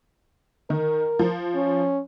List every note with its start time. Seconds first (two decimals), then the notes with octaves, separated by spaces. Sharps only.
0.70 D#3 A#4
1.19 F3
1.55 C#4